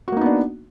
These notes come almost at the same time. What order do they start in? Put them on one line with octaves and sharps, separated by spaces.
F#4 A#3 D#4 B3 D4